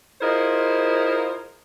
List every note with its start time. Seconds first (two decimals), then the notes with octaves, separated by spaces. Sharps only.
0.21 E4 F4 G#4 A#4 C5 D#5